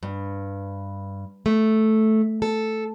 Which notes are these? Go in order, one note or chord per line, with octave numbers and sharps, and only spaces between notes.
G2
A3
A4